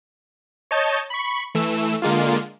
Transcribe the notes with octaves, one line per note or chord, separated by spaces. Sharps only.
C#5 D#5 A5 G6
B5 C#6
E3 A3 E6
D3 G#3 A#3 F4